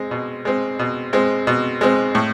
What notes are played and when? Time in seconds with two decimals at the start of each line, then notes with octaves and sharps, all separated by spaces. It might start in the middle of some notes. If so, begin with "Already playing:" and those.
Already playing: G#3 C4
0.11 B2
0.45 G#3 C4
0.79 B2
1.13 G#3 C4
1.47 B2
1.81 G#3 C4
2.15 A2